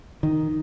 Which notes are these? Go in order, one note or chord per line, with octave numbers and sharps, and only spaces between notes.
D#3